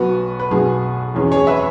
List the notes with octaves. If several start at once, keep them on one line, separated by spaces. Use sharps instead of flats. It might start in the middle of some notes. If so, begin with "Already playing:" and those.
Already playing: B1 B2 B3 F#4 B4
B4
B1 B2 B3 G#4
E2 E3 C#4 G#4
G#4 C#5
B4 E5